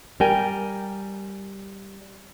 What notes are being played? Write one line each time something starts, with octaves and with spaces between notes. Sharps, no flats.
G3 A#4 G5 G#5